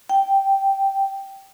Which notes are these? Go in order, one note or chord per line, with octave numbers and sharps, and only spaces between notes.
G5